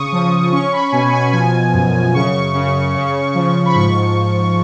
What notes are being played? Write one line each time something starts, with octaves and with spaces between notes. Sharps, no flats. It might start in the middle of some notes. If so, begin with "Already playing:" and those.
Already playing: C#3 C#6 D#6
F3 D#6
C#4 C#6
B5
B2 G#5
G#5
F3 G#5
F#2
C#3 C#6
C#3
C#3
F3
B5
G#2 C#6